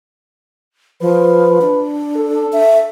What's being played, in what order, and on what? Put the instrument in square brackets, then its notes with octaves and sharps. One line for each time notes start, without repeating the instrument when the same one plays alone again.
[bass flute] F3 [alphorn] B4
[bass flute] D4
[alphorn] A4
[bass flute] E5